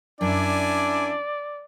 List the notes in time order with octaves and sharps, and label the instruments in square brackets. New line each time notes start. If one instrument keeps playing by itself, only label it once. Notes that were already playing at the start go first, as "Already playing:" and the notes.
[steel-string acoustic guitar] F#2 [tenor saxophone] D4 [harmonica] E4 G#5 [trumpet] D5